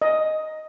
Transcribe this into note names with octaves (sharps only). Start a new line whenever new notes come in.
D#5